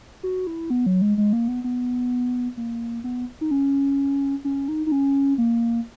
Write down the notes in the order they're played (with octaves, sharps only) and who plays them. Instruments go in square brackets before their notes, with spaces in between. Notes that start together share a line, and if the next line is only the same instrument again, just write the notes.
[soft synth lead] F#4
E4
B3
F#3
G#3
G#3
A#3
B3
B3
A#3
B3
D#4
C#4
C#4
D#4
D#4
C#4
A#3